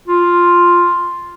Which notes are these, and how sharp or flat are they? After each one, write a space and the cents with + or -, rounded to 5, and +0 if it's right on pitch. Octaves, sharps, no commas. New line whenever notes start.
F4 +0